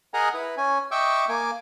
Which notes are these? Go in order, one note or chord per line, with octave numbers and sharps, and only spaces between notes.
G#4 A#4 D#5 F#5 G#5 A#5
E4 B4
C#4 G#5
D#5 E5 G5 C#6 D6 E6
A#3 G#5 D6